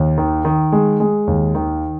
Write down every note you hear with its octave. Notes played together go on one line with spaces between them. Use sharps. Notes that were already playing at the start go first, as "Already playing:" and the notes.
Already playing: D#2
D#3
D#3
G#3
G#3
D#2
D#3